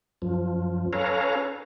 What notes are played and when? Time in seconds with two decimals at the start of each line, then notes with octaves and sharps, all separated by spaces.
0.22 F#2 F3
0.93 C#4 A4 B4 C#5 F5 A#5